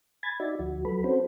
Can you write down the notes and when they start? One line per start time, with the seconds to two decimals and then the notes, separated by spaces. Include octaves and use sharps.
0.23 G#5 B5 G#6 A6
0.40 D#4 F#4 D5 E5
0.59 D2 F3 F#4
0.85 F#3 A4 B4 B5
1.04 C4 C#4 F#4 A4 C5